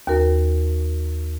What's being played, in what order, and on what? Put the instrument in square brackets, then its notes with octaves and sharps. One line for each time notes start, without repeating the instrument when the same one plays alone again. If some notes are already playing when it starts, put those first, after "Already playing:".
[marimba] D#2 F#4 A#4